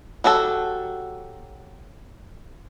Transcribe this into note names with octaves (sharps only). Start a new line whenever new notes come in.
F#3 F#4 G4 A4